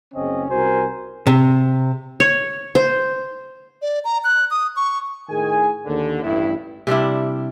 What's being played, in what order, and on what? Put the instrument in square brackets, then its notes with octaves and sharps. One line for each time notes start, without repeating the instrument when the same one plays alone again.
[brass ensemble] F#1 C#3 C4 C#4 D#5
C2 F#4 A#4 C5 G#5
[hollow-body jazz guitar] C3
[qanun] C#5
C5
[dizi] D5
A#5
F#6
D#6
C#6
[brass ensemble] A2 D#3 G#4 G#5
D#2 D3
A1 G2 E4
[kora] C3 G3 D4 E4